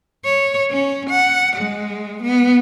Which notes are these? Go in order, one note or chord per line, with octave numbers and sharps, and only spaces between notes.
C#5
C#4
F#5
G#3
B3